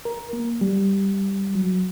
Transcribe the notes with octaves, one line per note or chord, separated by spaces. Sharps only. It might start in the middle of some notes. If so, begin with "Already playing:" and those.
A#4
A#3
G3
F#3